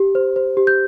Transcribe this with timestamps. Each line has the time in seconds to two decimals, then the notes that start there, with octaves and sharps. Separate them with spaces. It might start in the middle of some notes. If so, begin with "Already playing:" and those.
Already playing: G4
0.15 C5
0.36 C5
0.57 G4
0.67 G6